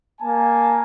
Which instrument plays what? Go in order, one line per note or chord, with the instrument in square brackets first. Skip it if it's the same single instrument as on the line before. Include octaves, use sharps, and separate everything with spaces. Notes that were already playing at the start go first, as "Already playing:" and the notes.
[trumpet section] A#3 G#5 A5